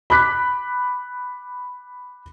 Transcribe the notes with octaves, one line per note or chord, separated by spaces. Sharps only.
B5 D6 F#6 B6